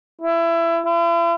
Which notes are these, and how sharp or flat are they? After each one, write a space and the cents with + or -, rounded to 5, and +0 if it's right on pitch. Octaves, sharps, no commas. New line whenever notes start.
E4 +25
E4 +45